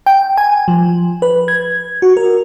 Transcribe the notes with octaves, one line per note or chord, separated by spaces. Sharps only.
G5
G#5
F3
B4
G#6
F#4
A#4